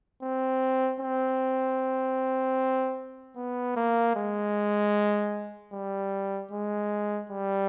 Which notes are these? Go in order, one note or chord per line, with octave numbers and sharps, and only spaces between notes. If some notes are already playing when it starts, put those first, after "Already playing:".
C4
C4
B3
A#3
G#3
G3
G#3
G3